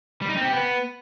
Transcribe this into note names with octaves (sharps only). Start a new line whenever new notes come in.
G3
D#4
C4
G4
B3